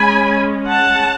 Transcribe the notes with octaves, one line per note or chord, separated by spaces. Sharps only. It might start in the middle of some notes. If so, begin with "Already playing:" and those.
Already playing: G#3 C#4 G#5 B5
F#5 A5